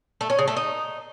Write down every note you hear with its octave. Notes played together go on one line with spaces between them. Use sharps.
A3
C#4
C#3
A3
D#4